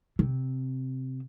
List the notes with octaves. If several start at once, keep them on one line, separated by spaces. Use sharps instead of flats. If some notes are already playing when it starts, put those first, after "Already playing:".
C3